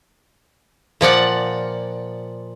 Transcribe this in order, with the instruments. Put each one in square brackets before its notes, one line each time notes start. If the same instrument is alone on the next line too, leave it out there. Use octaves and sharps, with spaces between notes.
[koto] A#2 F3 D5 F#5